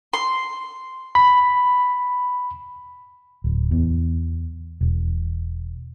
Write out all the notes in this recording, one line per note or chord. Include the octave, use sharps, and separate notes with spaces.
C6
B5
D1
E2
E1